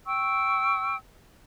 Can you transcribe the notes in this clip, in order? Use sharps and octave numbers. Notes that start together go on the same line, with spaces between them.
G5 C#6 E6